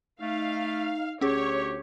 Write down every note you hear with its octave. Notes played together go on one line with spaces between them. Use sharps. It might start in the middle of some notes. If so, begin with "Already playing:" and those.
A3 D#4 F5
D2 C#4 G4 G#4 C#5